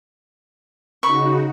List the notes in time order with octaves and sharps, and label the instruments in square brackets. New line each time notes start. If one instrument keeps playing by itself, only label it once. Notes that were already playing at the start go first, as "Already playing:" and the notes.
[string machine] C#3 D#4 F#4 [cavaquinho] B5 C#6